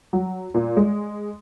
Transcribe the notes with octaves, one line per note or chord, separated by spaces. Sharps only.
F#3
A#2
G#3